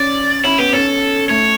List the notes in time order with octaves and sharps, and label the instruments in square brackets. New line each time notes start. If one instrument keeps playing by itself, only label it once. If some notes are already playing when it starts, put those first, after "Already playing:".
Already playing: [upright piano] C#4 [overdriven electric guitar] D5
[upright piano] C#4 [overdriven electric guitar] E4
[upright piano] B3 [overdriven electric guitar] G4
[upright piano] C#4 [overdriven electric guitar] A4
[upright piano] A3 [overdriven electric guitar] C#5